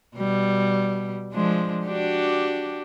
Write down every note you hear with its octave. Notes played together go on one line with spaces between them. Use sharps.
B2 G3
F3 G#3 D4
D4 F#4 G4